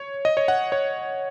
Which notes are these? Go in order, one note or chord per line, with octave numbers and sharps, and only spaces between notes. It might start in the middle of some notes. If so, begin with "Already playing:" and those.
Already playing: C#5
D#5
C#5
F#5
C#5